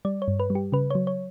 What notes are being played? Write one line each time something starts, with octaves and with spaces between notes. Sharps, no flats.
G3 D5
C#5
G2
B4
G3
G4
C#3 B4
F#3 C#5
C#5